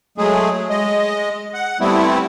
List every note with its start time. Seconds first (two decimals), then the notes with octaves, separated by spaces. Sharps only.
0.18 F#3 G#3 A3 G#4
0.70 G#3 D#5
1.54 F#5
1.80 G3 A3 B3 C4 E4